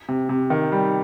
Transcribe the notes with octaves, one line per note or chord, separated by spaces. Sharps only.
C3
C3
D#3
G3